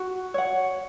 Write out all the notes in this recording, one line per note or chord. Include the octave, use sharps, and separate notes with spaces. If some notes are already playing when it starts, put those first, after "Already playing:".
Already playing: F#4
C#5 F#5